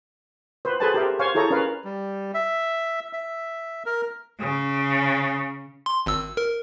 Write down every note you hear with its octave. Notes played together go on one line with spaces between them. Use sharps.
B4 C5
G#4 A4 B4 C5 G#5 A5
G4 A#4 C5 E5
C5 C#5 F5 G#5
E4 G#4 A4 C#5 A#5
C#4 A#4 B4 F5
G3
E5
E5
A#4
C#3
C6
G#1 E6
A#4